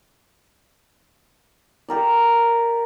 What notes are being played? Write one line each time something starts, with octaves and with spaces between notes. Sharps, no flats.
G4 A#4 D5